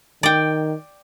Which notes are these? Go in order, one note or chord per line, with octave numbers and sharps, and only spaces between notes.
D#3 D5 G5